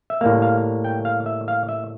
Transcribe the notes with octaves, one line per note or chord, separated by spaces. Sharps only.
E5
A2 G3 A#3 F5
F5
G5
F5
E5
F5
E5